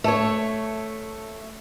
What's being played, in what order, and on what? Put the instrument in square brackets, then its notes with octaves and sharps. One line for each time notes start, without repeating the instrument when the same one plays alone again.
[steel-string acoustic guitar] A3 C#5